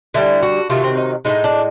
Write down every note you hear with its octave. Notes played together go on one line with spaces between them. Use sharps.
D3 G3 E4
F#4
C3 D#3 F#3 A3 F4
C4
D#4
A2 E3 G#3 D#4
D4